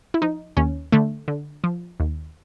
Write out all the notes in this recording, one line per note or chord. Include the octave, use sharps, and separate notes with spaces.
E4
F3 D#4
D#2 C#4
D3 A3
D3
F3
D#2